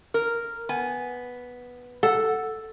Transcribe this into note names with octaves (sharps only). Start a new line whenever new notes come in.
A#4
B3 G#5
A4 F#5